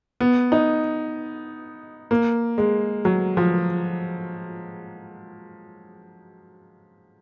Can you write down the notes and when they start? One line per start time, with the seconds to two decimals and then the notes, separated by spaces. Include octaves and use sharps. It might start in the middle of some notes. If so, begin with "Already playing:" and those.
0.20 B3
0.52 D#4
2.11 A#3
2.58 G#3
3.05 F#3
3.37 F3